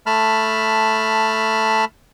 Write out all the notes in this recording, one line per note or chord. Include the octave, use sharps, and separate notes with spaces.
A3 A5 B5 F6